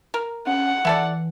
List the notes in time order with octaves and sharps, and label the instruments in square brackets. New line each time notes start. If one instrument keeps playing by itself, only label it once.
[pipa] A#4
[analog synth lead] C#4 [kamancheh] F#5
[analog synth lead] E3 [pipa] E4 A4 D5